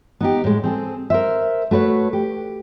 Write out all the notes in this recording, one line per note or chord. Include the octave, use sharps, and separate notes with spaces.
B3 D#4 G4
A2 G#3
C4 G#4 A4
A#4 C5 E5
A3 F#4 B4 C#5
G4